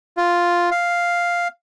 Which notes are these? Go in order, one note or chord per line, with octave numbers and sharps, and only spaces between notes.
F4
F5